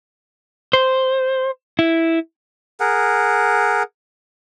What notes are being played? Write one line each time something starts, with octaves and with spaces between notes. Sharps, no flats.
C5
E4
G#4 A#4 F#5